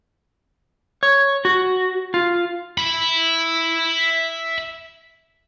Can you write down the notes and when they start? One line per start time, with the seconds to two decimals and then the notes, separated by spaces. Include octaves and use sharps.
1.03 C#5
1.45 F#4
2.14 F4
2.78 E5 B5